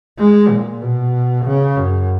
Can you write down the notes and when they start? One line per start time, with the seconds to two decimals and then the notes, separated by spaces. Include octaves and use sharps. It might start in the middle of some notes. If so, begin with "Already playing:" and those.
0.19 G#3
0.50 A#2
0.82 B2
1.45 C#3
1.77 F#2